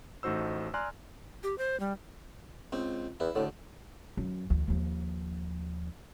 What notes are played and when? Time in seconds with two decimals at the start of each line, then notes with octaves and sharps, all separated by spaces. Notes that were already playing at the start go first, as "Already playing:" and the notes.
0.23 A1 A3 D#4 F#4 C5 E6
0.74 D5 G#5 A#5 C6 F6 F#6
1.43 G4
1.58 C5
1.80 G3
2.72 C#2 C4
3.20 E2 E4
3.35 D2 A2 D3
4.17 F#2
4.50 D2 E3
4.68 D#2 F3